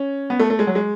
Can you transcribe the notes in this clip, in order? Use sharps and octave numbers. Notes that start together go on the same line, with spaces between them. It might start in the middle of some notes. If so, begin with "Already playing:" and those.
Already playing: C#4
B3
A3
A3
G#3
F#3
G#3